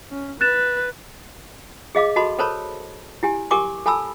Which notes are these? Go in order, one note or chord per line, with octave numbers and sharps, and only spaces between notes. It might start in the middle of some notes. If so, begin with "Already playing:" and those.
C#4
B4 F#6 A6 E7
G#4 D#5 F5 D6
F#4 A4 D#5 A5 B5 C6
A4 A#4 C5 C#5 A5 B5
E4 G4 G#5
G4 A#4 G#5 C#6 D6
A4 G#5 A5 B5 E6